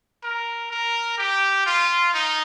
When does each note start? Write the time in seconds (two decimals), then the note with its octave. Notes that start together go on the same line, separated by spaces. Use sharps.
0.24 A#4
0.71 A#4
1.18 G4
1.66 F4
2.14 D#4